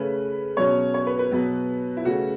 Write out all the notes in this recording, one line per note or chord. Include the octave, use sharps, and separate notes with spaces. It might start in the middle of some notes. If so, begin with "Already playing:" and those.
Already playing: C#3 A3 C#4 B4
B2 F#3 C#4 C#5
C#5
B4
B4
B2 F#3 B3
E4
C#3 A3 C#4 F#4